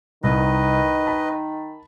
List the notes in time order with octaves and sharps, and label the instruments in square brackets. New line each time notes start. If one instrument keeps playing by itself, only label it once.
[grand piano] C2 [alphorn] D#3 [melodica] B4 D#5
[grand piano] A5 B5